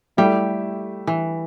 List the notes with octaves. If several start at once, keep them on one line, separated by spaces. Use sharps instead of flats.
G3 A3 E4 G4 E5
E3